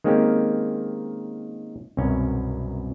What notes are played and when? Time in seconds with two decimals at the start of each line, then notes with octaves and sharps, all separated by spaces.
0.04 D#3 G#3 A#3 C4 C#4 G4
1.97 C2 F#2 B2 C#4